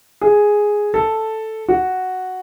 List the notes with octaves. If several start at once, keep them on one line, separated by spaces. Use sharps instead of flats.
G#4
A4
F#4